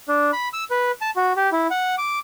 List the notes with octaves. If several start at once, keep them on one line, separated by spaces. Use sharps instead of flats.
D4
B5
E6
B4
A5
F#4
G4
E4
F#5
D6